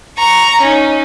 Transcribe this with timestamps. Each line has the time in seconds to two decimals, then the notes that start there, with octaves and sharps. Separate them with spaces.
0.18 A#5 C#6
0.61 C#4 D#4